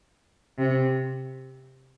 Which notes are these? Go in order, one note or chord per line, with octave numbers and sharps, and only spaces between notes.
C3